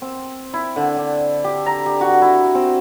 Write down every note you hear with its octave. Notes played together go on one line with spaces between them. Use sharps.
C4
E4
D3
D4
G4
A#5
G4
F#4
E4
C4